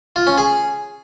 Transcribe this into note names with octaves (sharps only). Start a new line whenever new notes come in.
F4
C#4
G#4